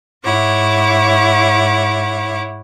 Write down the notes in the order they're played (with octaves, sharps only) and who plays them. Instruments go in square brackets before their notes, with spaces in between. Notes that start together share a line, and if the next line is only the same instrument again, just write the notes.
[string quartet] G#2 E4 C#5 F#5 D6